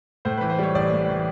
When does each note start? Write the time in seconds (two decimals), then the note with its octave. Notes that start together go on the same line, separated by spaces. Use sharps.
0.25 A2 C5
0.38 E3 B4
0.50 C5
0.59 G3 C#5
0.75 A1 D5
0.92 A2
1.09 E3